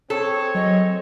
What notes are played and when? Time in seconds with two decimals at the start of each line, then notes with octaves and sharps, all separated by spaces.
0.10 C4 G#4 A4 C#5
0.55 F#3 D#5